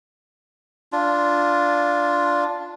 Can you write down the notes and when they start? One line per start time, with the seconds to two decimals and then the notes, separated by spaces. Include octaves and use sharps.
0.92 D4 F4